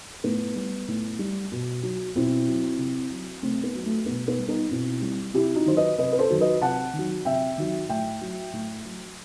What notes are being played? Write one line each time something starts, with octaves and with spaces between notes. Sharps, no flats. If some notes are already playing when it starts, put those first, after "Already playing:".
A2 B3
G3
A2
G3
B2
F#3
B2 C4 E4
F#3
C3
F#3
C3 A3 C4
B3
F#3
A3
B2 B3
B3
G3
B3 D#4
B2 C4 E4
G3
C3 E4 G4
D#4 F#4
D#3 F#3 C5
B4 D#5
C3 B4 D#5
B4
A4 C5
D#3 F#3
B4 D#5
C3 F#5 A5
D#3
F#3
C3 E5 G5
D#3 F#3
A2 E5 G5
F#3
A2
F#3